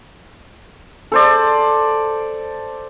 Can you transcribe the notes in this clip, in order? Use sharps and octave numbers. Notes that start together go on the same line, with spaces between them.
A4 C5 D5